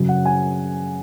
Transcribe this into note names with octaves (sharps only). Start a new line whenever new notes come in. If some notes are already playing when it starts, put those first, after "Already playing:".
Already playing: F#2 C#3 F#3
F#5
G#5